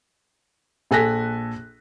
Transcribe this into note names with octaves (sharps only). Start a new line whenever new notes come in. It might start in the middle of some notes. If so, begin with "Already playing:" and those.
A#1 A4 G#5 F#6 A#6 B6